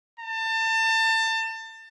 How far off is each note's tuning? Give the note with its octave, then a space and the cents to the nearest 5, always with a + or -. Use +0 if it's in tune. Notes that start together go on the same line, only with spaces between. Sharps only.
A5 +30